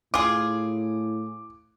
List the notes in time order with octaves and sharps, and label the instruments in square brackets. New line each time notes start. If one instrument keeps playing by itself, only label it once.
[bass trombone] A2 [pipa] F4 G#4 [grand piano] D6